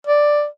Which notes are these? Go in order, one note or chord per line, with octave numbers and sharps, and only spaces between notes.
D5